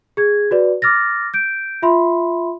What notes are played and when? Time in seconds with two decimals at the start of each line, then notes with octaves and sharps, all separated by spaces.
0.17 G#4 G#6
0.51 F#4 B4 D5
0.82 D6 F6 A6 A#6
1.34 G6 D7
1.82 F4 E5 B5 C6